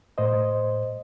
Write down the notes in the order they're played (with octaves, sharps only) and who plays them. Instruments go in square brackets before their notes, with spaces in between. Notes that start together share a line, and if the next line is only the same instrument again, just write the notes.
[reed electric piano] A2 C5 D#5